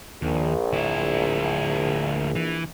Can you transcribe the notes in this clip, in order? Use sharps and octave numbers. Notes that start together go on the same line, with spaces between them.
A#1 D#2
D2 E4
E3